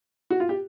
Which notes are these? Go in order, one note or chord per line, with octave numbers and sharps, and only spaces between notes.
F#4
F4
G4